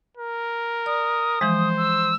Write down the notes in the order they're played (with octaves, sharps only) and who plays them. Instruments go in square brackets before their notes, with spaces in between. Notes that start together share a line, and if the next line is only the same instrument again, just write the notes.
[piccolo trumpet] A#4
[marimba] D5 [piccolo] D#6
[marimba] E3 F3 G#3 [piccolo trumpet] C5
[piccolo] E6